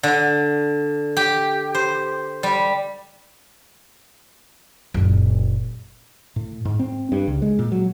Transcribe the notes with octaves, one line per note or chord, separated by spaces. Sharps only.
D3
G4
C5
G3
F#1 A#2
A2
G#2
C4
G2
C#2
G#3
A#2
F#3